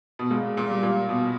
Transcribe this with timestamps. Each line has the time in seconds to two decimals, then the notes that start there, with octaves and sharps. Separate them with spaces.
0.19 B2
0.30 A#2 G#3
0.57 A#2
0.70 G3
0.83 A#2
1.09 B2